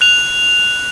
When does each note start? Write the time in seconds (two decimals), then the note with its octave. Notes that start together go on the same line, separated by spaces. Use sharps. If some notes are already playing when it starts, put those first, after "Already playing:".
0.01 F#6 F7